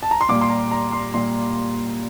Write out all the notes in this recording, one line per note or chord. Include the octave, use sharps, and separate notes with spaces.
A5
A#5
C6
A#2 G3 A#3 D6
C6
A#5
A#5
C6
A#2 G3 A#3 C6